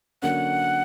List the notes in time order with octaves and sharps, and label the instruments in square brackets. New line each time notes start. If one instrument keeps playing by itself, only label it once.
[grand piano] D3 F#3 A#3 C#4 [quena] F#5